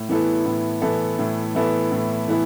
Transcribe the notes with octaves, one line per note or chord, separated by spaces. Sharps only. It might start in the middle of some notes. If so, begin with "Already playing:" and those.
Already playing: A2
E3 B3 E4 A4
A2
E3 B3 E4 A4
A2
E3 B3 E4 A4
A2
E3 B3 E4